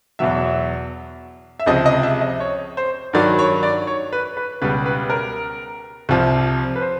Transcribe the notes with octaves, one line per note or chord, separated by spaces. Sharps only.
E2 B2 F#3 E5
E5
C#2 C3 F3 D#5
D#5
E5
D#5
C#5
C5
G2 D#3 F#3 D5
C#5
D5
C#5
B4
B4
C#2 B2 G3 B4
B4
A#4
C2 C3 F3
B4
C5